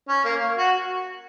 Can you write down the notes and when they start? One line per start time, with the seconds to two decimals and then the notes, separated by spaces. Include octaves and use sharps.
0.09 C#4
0.25 A#3
0.58 F#4